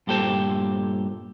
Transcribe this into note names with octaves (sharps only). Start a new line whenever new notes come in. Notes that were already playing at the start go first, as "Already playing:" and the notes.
G2 A#2 G4 A4 C5 A5